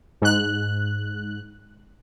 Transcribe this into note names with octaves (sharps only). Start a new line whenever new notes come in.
G#2 F#6